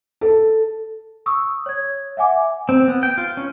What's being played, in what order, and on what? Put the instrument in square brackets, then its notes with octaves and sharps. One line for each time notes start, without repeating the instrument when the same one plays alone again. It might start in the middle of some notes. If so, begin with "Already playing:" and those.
[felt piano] A4
[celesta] C#6 D#6 E6
C#5 G#6
E5 F#5 G#5 D6
[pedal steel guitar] C4
B3
G5
F4
C#4